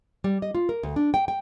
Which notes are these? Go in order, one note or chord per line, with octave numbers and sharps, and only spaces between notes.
G3
D#5
F4
A#4
D2
D4
G5
G5